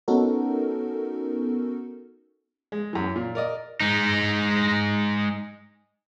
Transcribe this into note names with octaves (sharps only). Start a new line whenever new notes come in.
B3 C#4 D#4 F#4 A4 A#4
G#3
F#2 E3
A#2
A#4 D5 D#5
G#3 D#4